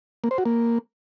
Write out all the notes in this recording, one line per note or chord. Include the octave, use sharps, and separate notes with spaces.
A#3
C5
F#4
A#3